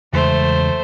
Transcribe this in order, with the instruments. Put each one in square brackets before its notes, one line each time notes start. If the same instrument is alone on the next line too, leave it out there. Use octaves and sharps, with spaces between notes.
[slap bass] E2 C#3 G#3 [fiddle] A3 C5